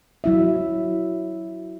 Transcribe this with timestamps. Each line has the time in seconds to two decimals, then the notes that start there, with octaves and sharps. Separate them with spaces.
0.24 F#3 E4 E5